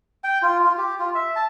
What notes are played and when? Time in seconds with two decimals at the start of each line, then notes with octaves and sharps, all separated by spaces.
0.24 G5
0.42 F4
0.64 F4
0.78 G4
0.99 F4
1.15 E5
1.36 A5